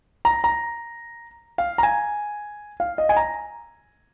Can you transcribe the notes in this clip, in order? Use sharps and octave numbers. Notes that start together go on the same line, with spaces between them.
A#5
A#5
F5
A#5
G#5
F5
D#5
G#5
A#5